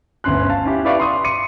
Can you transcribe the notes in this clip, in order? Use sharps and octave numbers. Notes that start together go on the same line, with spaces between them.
G1 D2 B3 C#4 C6 F#6
F5 A5
C#4 E4 G4
E4 G4 B4 D5 F5 C#6
B5 C6 D#6
C6 D6 C#7 D#7